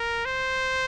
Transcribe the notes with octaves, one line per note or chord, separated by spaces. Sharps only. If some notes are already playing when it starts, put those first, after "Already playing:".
Already playing: A#4
C5